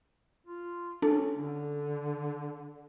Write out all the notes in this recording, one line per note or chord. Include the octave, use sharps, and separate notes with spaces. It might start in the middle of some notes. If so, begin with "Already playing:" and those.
F4
C#4 D4 A4
D3